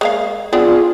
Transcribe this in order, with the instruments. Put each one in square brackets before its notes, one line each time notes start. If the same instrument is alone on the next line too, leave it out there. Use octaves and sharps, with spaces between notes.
[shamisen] G#3 A#3 F5
[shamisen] B3 C4 D4 [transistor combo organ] F4 G#4